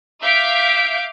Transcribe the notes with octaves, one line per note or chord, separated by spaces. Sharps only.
E5 F5 D6 G6 B6 D7